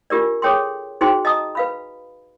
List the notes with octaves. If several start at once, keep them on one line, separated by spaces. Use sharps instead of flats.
D4 F4 G4 A#4 D5
G#4 A4 C#5 G5 C6
D#4 F#4 G#4 C5 G5 C6
D#5 A5 A#5 D#6
B4 F5 B5